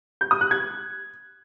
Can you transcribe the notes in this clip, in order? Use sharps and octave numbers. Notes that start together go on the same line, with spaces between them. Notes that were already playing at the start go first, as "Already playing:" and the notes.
G6
D#6
F#6
G#6